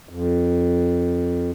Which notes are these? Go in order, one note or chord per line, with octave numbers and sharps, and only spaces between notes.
F2